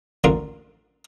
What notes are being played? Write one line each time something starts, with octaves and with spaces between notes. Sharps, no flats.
A1 D2 D3 A#3 F4